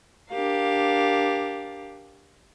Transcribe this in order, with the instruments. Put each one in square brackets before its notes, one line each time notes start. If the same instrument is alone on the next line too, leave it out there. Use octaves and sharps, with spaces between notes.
[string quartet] D4 G4 A#4 F5